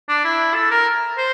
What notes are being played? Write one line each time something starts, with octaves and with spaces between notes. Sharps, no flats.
D4
E4
A4
A#4
C5